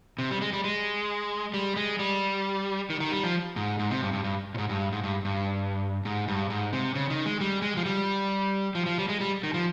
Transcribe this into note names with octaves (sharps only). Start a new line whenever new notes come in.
C3
G3
G#3
G3
G#3
G3
G#3
G3
D#3
D#3
G3
F3
G#2
G#2
C3
G2
G2
G2
A#2
G#2
G2
G#2
G2
G2
G#2
G2
G#2
C3
C#3
D#3
G#3
G3
G#3
F3
G3
F3
F3
G3
G#3
G3
D#3
F3